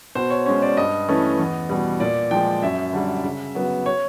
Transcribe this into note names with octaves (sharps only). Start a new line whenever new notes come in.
B2 C5
C#5
G#3 C#4 C#5
D5
G2 D#5
E3 A3 C#4
E2
B2 G3
A#2 D5
F3 G#3 G5
F#2 E5
D3 G3
C#3
F#3 B3
C#5